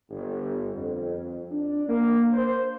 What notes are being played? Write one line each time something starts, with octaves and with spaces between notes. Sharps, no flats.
G1
F2
D4
A#3
C5